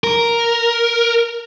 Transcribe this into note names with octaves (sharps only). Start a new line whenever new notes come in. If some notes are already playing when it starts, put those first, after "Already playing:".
A#4